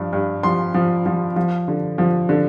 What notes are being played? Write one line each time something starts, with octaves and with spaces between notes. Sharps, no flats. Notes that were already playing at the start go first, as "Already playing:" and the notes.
Already playing: G2 F3
G2
F3 C6
F3
F3
F3
D3
F3
D3